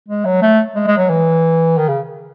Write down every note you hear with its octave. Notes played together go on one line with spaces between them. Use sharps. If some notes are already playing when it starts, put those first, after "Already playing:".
G#3
F#3
A3
G#3
G#3
F#3
E3
D#3
C#3